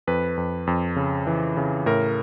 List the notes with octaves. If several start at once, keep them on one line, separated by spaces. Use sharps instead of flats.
F2 B4
F2
F2
C#3
E3
C#3
A2 A#4